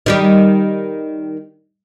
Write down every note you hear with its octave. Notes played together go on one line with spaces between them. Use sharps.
D#3 G3 G4